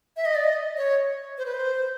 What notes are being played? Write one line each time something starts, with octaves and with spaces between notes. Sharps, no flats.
E5
D#5
D5
D#5
C#5
C5
B4
C5